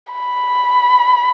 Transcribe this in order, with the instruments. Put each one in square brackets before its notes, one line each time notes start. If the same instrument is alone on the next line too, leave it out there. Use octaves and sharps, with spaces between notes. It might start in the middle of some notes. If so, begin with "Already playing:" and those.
[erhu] B5